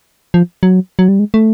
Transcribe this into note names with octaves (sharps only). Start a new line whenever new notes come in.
F3
F#3
F#3
G3
G#3
A3